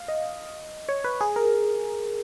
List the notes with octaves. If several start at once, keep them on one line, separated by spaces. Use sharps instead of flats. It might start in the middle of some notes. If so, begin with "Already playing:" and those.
Already playing: F5
D#5
C#5
B4
G#4
A#4